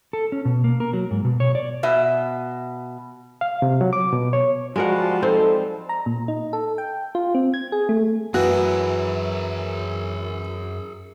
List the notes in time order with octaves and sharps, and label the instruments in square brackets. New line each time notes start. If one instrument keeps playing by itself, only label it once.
[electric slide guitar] A4
C#4
B2
A#3
A#4
F#3
G#2
B2
C#5
D5
[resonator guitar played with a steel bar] B2 E5
[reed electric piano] F5
C3
F#3
D6
B2
C#5
[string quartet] F3 G3 A5 [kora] G#3 A#4 F#5 [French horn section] F#4
[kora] C4 [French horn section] D#4 A4
[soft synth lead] A#5
A#2
D#4
A4
G5
F4
C4
G#6
G#4
A3
[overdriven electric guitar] F#2 [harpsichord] E3 [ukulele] F#4 [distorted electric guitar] G#4 A#4